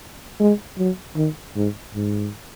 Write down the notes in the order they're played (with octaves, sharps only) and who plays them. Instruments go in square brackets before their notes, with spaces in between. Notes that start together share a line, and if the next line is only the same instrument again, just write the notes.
[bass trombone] G#3
F#3
D#3
G#2
G#2